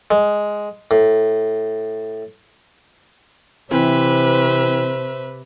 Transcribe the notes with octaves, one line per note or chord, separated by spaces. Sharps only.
G#3
A2
C3 E3 C4 B4 C5 E5